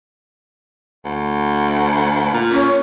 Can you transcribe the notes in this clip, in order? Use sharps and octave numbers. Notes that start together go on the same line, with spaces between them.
D2
A#2
C#4